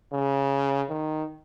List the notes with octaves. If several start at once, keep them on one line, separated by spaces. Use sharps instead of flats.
C#3
D#3